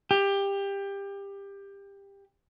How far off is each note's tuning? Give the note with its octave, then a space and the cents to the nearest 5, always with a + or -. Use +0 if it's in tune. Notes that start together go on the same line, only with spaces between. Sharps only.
G4 +20